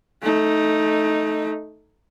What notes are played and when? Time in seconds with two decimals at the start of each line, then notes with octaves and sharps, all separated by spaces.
0.22 A3 D#4